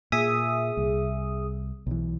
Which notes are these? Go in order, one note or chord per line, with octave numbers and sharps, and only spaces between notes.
A#2 G#4 E5 D#6
C2
B1 E3